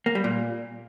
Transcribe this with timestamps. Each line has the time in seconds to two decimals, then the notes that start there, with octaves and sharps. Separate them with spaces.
0.06 A#3
0.15 G3
0.24 A#2